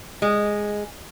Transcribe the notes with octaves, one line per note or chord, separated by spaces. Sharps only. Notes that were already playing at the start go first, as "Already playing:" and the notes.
G#3